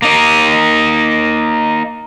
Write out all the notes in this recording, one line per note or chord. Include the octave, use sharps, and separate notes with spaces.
A#3 D#4